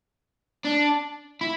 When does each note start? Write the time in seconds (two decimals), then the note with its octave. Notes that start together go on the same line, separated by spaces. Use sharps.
0.65 D4
1.41 E4